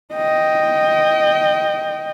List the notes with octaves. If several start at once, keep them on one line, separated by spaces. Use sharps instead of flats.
D#5 G5